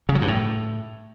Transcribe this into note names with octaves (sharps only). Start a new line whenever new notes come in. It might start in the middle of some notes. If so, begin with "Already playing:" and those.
C#3
F#3
G2
A2